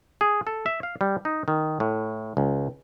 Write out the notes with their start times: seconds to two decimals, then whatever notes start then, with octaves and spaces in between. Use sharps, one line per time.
0.21 G#4
0.47 A4
0.66 E5
0.83 F5
1.01 G3
1.25 D#4
1.48 D#3
1.80 A2
2.37 C#2